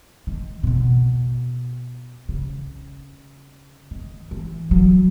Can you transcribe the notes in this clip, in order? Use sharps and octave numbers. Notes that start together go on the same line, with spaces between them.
D#3
A#2
B2
C#3
D#3
E3
F#3